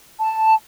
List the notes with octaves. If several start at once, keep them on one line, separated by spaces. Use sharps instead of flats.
A5